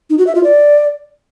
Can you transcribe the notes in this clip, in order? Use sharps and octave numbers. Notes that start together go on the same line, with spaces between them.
D#4
F#4
E5
F4
D5